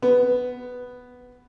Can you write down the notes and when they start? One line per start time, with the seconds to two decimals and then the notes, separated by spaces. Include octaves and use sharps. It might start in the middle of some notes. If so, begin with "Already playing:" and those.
0.02 B3